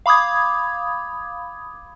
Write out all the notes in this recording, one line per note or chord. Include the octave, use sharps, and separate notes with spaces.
F5 B5 D6 D#6 G#6